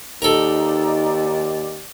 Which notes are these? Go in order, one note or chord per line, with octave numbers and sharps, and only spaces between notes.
D#2 D#4 A4 A#4 D5